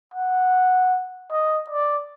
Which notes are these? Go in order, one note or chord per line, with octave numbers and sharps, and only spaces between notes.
F#5
D#5
D5